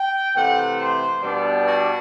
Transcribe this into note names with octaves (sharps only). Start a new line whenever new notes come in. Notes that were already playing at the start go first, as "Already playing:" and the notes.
Already playing: G5
C3 E3 A3 F#5
C5
B2 G3 B3 D4
F#4